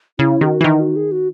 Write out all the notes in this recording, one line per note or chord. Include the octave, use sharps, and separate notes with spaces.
C#3 E4
D#3 F#4 G#4
E3
D#3 D#4
F#4
G#4
F#4